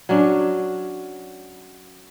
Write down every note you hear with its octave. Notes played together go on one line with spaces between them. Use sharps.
F#3 C#4 D4